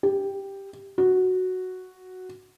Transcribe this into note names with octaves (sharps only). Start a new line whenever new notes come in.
G4
F#4